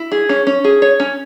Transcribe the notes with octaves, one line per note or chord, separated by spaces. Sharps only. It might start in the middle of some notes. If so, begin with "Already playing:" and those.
Already playing: E4
G#4
C#4
C#4
G#4
C#5
C#4